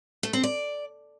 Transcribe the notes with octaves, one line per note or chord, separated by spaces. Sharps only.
A3
C4
D5